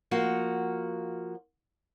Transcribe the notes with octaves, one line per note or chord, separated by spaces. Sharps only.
F3 A#3 F#4